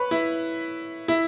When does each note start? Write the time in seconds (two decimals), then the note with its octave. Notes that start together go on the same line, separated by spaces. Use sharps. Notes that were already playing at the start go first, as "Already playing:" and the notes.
Already playing: B4 C#5
0.11 E4
1.08 E4